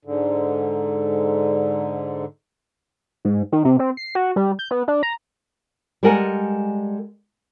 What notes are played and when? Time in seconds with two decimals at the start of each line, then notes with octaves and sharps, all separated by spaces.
0.05 G#2 D3
3.25 G#2
3.52 D#3
3.65 C3
3.79 C4
3.97 C7
4.15 F#4
4.36 G3
4.59 G6
4.71 B3
4.88 D4
5.03 A#5
6.03 G3 G#3 A4 A#4 F#5 G#5